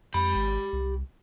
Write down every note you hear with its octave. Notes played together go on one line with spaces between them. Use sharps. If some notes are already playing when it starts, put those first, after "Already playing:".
F2 G4 B5
G#1
C2